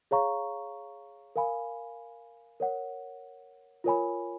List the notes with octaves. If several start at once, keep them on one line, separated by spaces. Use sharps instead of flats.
G#4 C#5 F5 A#5 C#6
A#4 F5 G#5 B5
A#4 C#5 F#5
F4 A#4 C#5 G#5 B5